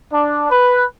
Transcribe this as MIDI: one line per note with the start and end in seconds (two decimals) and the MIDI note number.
0.12 0.49 62
0.51 0.83 71